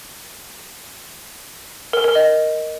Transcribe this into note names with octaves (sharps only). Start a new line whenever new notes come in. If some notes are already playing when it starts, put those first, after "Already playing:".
A#4
A#4
D#5